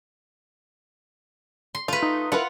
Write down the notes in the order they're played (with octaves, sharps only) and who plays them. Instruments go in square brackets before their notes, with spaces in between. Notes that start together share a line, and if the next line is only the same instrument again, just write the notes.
[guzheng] C6
[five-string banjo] A3 [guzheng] F4 B4
[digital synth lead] D#4
[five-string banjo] E4 A#4 B4 [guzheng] F4 [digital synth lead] F#5